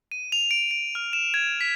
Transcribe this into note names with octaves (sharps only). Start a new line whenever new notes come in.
D#7
F7
D7
D7
F6
E7
G#6
B6